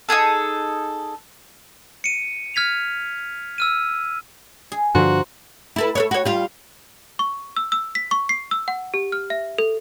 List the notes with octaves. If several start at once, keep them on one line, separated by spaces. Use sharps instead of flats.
D#4 F4 G#4 A4
C#7 D#7
F6 G#6 B6 C#7 F7
E6 F6 D#7
G#4
G2 D3 F3 F#4 C5 A#5 C6
E4 A4 B4
A4 B4 C#5
F#4 C#5
G3 F4
C#6
E6
E6
B6
C#6
C7
E6
F#5
G4
F6
E5
A4